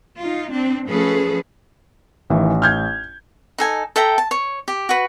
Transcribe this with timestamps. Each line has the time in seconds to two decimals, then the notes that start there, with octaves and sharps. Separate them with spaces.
0.18 D#4 F4
0.51 C4 D4
0.87 F3 A3 C#4 G#4 A4 B4
2.30 A1 D#3 E3
2.62 F6 G6 G#6
3.58 D#4 A4 G#5
3.96 A4 E5 G5 A#5
4.18 A5
4.31 C#5
4.68 G4
4.89 F#4 B4